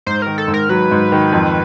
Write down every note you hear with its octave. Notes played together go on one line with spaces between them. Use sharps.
G#2 C5
D#3 A#4
A4
G#2
A#4
F#3 B4
G#2
D#3
F2